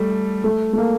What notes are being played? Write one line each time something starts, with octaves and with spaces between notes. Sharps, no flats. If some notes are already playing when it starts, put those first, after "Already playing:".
Already playing: G3 A3
A3
A3
A#3